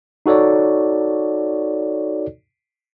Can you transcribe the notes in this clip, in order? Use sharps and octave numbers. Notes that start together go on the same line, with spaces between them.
D#4 F#4 A4 C#5 D5